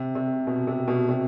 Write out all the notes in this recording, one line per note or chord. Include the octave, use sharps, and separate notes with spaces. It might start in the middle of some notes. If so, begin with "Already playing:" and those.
Already playing: C3
C3
B2
C3
B2
C3